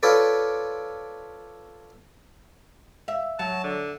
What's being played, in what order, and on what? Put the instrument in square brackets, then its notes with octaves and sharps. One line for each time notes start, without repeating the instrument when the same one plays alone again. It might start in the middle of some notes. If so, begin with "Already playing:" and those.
[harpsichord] F4 A4 B4 C#5 D5
[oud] E5
[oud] F#3 [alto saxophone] A5
[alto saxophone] D3